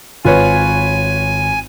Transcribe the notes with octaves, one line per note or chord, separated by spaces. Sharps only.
G#1 F4 B4 C#5 G#5